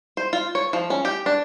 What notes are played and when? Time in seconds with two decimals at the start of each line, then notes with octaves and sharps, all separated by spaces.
0.17 C5
0.33 F4
0.55 C#5
0.73 F3
0.90 C#4
1.05 G4
1.26 D4